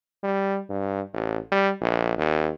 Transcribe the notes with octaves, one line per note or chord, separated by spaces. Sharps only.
G3
G2
A1
G3
A#1
D#2